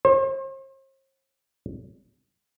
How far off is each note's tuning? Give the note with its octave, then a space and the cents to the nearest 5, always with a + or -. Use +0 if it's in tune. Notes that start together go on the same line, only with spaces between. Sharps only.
C5 +45